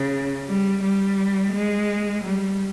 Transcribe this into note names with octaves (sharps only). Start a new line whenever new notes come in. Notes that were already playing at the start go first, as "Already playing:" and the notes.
Already playing: C#3
G3
G3
G#3
G3